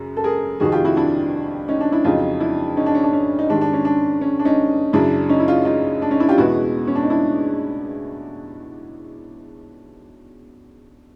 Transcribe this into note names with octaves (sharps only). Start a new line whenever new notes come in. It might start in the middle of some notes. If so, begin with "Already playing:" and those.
Already playing: F#2 C#3
A4
G#4 A#4
F2 C3 D#3 G3 F#4 G#4
F4 G4
E4 F#4
D4 E4
C#4 D#4
D4
D4 E4
F2 C#3 F#3 D#4 F4
D4 E4
C#4 D#4
D4
C#4
D4
C#4
D#4
G#2 D#3 G3 D4
D4
C#4
D4
C#4
D4
C#4 D#4
F#2 C#3 F#3 D4 E4
C#4 D#4
E4
D#4 F4
D#4 F4
D4
C#4 D#4
D4 E4
F4 G4
E2 B2 G#3 B3 E4 F#4
C#4
D4
D#4
D4 E4